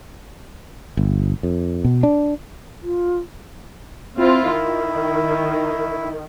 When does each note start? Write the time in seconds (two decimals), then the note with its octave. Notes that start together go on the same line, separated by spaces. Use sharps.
0.97 G1
1.43 F2
1.85 B2
2.03 D4
2.81 F4
4.18 C4 E4 F4
4.52 D#3